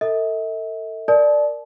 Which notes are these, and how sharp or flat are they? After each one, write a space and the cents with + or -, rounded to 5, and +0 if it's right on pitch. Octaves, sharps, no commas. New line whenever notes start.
A4 +35 E5 -45
A#4 -5 D5 +5 A5 -30